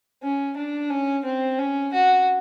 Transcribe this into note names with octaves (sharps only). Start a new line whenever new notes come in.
C#4
D4
C#4
C4
C#4
F#4